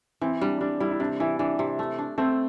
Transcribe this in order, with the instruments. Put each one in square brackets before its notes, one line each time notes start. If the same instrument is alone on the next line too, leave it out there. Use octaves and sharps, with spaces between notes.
[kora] E3 [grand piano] C4
[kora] G3 [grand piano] D4
[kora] G3 [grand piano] D4
[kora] G3 [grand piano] E4
[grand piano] E4
[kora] C3 [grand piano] D4
[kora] E3 [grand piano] E4
[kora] E3 [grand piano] D4
[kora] C3
A3
D4
[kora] A3 [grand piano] C4